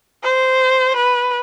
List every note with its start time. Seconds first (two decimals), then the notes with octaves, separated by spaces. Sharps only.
0.24 C5
0.96 B4